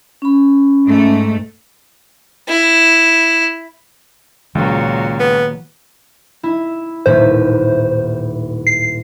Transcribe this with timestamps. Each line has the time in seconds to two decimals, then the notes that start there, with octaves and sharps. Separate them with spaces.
0.22 C#4 B5
0.85 G#2 A3
2.49 E4
4.55 C#2 A#2 D#3 F#3 A#3
5.20 B3
6.43 E4
7.06 D#1 A2 B4 C5
8.67 C7